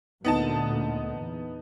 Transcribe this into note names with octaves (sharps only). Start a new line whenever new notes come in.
D2 A#2 D3 B3 D#4 A5
E2